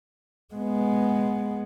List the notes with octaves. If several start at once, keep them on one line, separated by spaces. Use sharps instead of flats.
G#3 B3